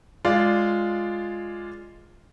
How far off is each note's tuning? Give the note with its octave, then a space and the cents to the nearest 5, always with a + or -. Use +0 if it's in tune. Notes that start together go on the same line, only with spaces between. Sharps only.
G#3 +0 F4 +0 D5 +0